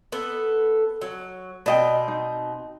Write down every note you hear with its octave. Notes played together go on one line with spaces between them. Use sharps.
B3 A4
F#3
B2 C4 D5 D#5 G5
D#4